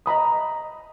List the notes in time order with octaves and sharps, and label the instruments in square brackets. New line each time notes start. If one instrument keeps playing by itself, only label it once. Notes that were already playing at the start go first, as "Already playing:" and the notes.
[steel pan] D#5 A#5 B5 D#6